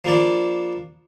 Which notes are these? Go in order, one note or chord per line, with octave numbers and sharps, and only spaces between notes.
F3 G3 A#3 D4 D5